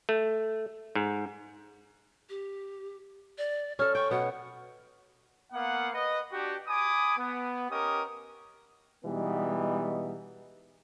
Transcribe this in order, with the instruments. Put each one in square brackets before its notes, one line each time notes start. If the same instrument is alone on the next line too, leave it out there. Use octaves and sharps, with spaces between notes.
[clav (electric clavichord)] A3
G#2
[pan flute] G4
D5
[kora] C#4 A4 [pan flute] F6
[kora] G5 [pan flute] C#6
[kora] B2 B3 [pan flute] F#5
[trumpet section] A#3 B3 F5 F#5
B4 D#5
D4 F#4 G4
G#5 B5 D6 D#6
B3
C#4 G4 A#4 D#5 D#6
[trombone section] B2 E3 G3 G#3 B3 D#4